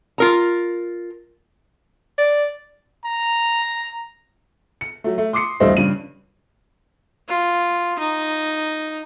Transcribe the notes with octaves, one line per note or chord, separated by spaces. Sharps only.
F4 A#4 A#5
D5
A#5
C#7
F#3 A3
A3
C6 D6 D#6 C7 C#7
D#1 G2 E3 A3 C5 D#5
G2 C#3 D#7
F4
D#4